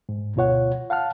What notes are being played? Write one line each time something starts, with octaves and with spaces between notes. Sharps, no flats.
G#2
D2 B2 F4 C#5 F#5
F5 F#5 A5 F6